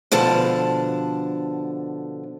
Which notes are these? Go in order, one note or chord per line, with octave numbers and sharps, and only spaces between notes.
B2 D3 F3 A5